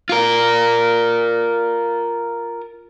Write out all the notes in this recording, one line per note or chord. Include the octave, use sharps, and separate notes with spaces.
F4 A#4